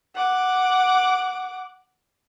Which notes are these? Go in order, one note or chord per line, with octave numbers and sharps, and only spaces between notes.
F#5 D6